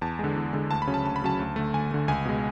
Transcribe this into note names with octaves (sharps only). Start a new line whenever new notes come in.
E2 A5
D3 G#3
E2
D3 G#3
D2 A5
B5
C#3 F#3 C#4
A5
D2 A5
B5
C#3 F#3 C#4 A5
D2
D3 A3
D2 G#5
D3 A3
C#2 G#5
B2 G#3